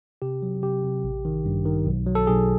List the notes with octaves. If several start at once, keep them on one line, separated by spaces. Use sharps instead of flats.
C3 G4
F#3
C3 G4
C3
A1
D#3
G2
D#3
B1
F#3
A4
B1 G#4